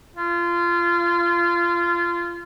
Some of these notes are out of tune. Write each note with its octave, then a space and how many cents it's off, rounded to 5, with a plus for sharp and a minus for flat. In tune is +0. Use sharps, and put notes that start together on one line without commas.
F4 -25